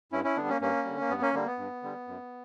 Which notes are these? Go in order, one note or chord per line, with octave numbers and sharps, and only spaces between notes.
G2 C#4 E4
C#4 E4
D3 G3 B3 D4
A#3 C#4
G2 A#3 C#4
D3 G3
A#3
G2 B3
A#3 C#4
D3 G3 A#3
B3
G2
D3 G3
F#2